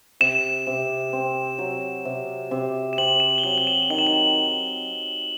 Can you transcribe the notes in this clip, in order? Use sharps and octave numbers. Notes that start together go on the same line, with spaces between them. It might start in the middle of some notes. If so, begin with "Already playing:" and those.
C3 E7
C3
C4
F#3
C3
C3
E7
C4 F#7
E7
G7
F#3 F#7
F#7
E7
D#3 F#7
E7
F#7